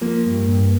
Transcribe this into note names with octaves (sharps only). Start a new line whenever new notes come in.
F3 A#3
G2
G2